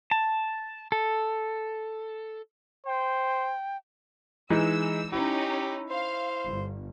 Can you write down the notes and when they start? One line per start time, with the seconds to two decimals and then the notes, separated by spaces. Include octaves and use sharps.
0.11 A5
0.92 A4
2.86 C5 G5
4.50 E3 G#3 D#4 E6
5.12 C#4 D#4 E4 G4
5.90 C5 F5
6.47 G1